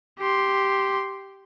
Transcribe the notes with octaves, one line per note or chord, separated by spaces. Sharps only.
G4 C6